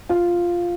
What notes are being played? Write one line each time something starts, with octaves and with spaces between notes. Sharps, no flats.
F4